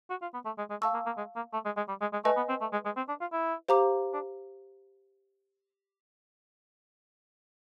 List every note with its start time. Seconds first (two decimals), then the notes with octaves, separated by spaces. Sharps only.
0.10 F#4
0.22 F4
0.34 B3
0.45 A3
0.58 G#3
0.70 G#3
0.82 A3 F5 A5 C#6 E6
0.94 A#3
1.06 A#3
1.17 G#3
1.36 A#3
1.53 A3
1.65 G#3
1.77 G#3
1.88 G3
2.01 G#3
2.13 G#3
2.25 A3 B4 D#5 G#5
2.36 B3
2.49 C4
2.61 A3
2.72 G#3
2.85 G#3
2.96 C4
3.08 D4
3.21 F4
3.32 E4
3.68 G4 C5 F5 A#5 D6
4.14 D4